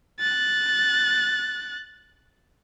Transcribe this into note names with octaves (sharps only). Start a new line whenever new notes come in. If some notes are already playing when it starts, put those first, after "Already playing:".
F#6 A6